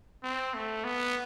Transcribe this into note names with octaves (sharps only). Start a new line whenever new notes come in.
C4
A3
B3